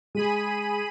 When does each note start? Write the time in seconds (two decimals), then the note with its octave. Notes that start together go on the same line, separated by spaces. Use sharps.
0.15 G#3 G#4 B5 D#7